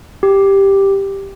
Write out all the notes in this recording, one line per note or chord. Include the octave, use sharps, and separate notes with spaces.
G4